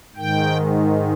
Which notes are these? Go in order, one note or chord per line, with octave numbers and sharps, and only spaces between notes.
G#2 D#3 G5